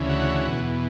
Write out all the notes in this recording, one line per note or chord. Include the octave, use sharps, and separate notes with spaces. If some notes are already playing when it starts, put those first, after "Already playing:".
Already playing: D2 C#3 E3
F#4
E2 B2